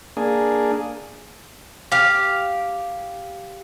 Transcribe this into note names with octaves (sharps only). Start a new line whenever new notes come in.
A#3 D4 G#4
G4 F5